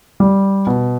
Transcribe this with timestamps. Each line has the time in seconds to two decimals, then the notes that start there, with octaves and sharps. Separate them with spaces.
0.20 G3
0.67 B2